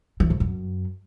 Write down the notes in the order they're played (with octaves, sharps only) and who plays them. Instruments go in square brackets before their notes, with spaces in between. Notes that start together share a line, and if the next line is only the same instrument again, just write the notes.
[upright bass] E3
G#2
F#2